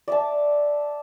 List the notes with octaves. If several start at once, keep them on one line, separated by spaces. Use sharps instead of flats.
D5 E5 A5